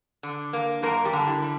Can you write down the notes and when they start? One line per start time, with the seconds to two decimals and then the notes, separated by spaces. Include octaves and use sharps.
0.23 D3
0.53 A#3
0.82 F#2 A#3 A#4
1.05 G3 G4
1.13 D3
1.27 E4
1.43 G3